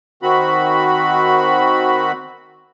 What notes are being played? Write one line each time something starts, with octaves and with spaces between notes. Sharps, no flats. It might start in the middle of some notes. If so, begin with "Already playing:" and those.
D#3 C4 F#4 B5